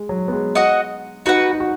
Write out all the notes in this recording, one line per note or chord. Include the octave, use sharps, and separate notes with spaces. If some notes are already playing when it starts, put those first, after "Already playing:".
Already playing: G#3
F#3
B3
G#3
F#4 D#5 F#5
D#4 F#4 B4 F#5
D#4
F#4